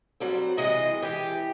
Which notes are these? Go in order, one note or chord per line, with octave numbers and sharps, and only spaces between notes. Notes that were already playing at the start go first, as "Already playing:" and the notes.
F#3 G3 C4
C3 E3 G#3 D#5
E3 G4